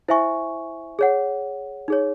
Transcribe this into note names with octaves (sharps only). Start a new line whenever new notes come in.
E4 C5 E5 G#5 C#6
G#4 C#5 F#5
D#4 G#4 C#5